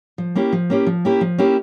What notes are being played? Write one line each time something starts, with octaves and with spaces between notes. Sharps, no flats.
F3
A#3 C#4 E4 G4
F3
A#3 C#4 E4 G4
F3
A#3 C#4 E4 G4
F3
A#3 C#4 E4 G4